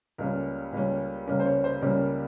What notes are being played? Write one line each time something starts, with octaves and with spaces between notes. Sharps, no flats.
C#2 C#3 G3 A#3 C#4 A#4
C#2 C#3 G3 A#3 C#4
C#2 C#3 G3 A#3 C#4 A#4
C5
C#5
C5
C#2 C#3 G3 A#3 C#4 A#4